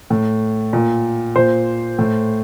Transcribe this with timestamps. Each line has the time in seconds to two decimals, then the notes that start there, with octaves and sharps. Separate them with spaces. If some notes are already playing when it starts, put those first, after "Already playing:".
0.10 A2
0.73 A#2
1.36 A#2 C5
1.99 A2